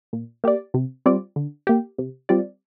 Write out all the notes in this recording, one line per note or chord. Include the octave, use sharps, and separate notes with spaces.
A#2
A#3 G4 D5
C3
G3 C4 F4 D5
D3
A#3 G4
C3
G3 C4 F4 D5